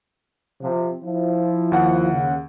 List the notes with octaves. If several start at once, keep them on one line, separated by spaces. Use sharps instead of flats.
C3 F3
F3 E4
D#2 F#5
C#3